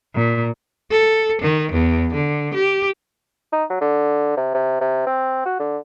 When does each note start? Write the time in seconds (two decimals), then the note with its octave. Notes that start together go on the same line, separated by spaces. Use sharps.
0.15 A#2
0.91 A4
1.42 D#3
1.72 E2
2.13 D3
2.54 G4
3.52 D#4
3.70 F#3
3.81 D3
4.37 C3
4.54 C3
4.80 C3
5.06 C4
5.46 F#4
5.59 D3